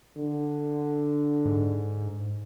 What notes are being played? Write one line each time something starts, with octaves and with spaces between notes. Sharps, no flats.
D3
G#2